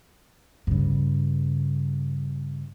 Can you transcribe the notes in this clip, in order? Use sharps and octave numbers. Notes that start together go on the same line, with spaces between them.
G2 C#3